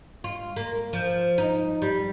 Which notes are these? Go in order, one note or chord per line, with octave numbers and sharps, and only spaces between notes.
F4
A#3
F3
D#4
G3